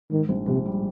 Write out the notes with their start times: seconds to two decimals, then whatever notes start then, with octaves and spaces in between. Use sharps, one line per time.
0.11 G#2 D#3
0.29 A#1
0.47 A#1 C3
0.66 G3